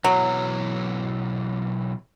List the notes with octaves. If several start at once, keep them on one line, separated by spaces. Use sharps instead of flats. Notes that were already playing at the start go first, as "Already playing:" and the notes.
B1 E3 F#3